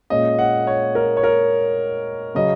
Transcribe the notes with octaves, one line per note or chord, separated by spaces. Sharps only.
A#2 G#3 C#4 D#5
F#5
C#5
A#4
C#5
A#4
C#3 F#3 C#4 D#5